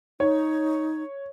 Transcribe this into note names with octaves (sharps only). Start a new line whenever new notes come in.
D#4 C#5